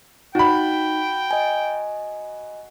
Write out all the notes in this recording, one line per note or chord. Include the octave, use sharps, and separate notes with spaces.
D#4 F#4 G5 B5
D#5 G#5